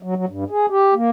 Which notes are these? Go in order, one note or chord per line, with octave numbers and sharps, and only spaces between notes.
F#3
F#3
G2
G#4
G4
A#3